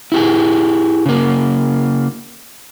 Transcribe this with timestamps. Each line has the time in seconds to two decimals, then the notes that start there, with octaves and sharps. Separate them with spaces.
0.12 E4 G4 G#4
1.06 C#3 A#3